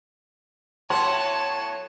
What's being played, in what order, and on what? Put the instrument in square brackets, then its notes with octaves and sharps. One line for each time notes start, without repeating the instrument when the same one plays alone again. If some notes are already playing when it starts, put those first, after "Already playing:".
[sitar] A2 F#3 B3 [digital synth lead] C#5 [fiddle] A5 [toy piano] C6